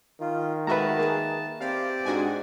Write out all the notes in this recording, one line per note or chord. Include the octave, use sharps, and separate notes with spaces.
D#3 F4
G#3 A3 F#4 B4 E5 A5 A#5
A#3 G#4
C4 G4 D5 F5
G#2 D4 F#4 G#5